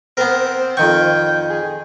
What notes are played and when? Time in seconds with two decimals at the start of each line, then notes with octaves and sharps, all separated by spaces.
0.17 B3 C4 A#4
0.77 F2 D#3 G5 C#6
1.49 G#4